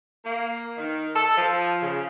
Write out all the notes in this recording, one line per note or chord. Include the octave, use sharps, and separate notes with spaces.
A#3
D#3
A4
F3
C#3